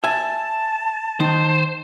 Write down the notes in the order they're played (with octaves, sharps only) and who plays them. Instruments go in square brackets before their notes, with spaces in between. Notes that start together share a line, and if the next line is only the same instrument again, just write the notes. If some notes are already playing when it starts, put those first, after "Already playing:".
[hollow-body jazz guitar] E5 G#5 [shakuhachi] A5
[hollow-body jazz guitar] D#3 D#4 [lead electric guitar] C5